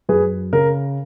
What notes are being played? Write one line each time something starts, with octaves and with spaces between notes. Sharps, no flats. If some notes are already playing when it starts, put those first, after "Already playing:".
F#2 G#4 B4
C#3 A#4